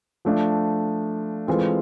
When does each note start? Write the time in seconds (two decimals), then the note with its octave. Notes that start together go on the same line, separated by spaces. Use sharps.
0.25 F3 A3 D4 F4
1.47 E3 G#3 C4 F4 A4